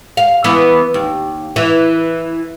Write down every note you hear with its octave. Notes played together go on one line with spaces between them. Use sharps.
F5
E3 B3
D#2
E3